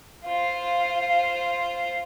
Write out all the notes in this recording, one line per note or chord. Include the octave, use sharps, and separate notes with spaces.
F4 C5 F5